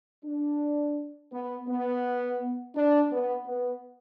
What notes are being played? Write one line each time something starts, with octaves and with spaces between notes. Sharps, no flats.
D4
B3
B3
D4
B3
B3